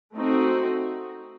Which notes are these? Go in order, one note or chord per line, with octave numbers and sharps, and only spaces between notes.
A3 C4 D#4 F#4